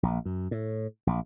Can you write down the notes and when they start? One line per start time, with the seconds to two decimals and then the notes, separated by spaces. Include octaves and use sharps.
0.03 A#1
0.25 F#2
0.51 A2
1.07 A#1